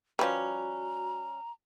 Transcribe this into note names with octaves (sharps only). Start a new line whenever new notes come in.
F3 G3 C#4 F#4 B4 A#5